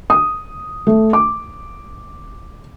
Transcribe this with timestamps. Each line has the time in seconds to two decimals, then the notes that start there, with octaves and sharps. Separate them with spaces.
0.10 D#6
0.87 A3
1.13 D6